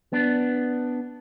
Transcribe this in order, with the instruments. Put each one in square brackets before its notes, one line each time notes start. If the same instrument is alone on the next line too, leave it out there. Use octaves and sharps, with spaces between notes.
[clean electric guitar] B3 D4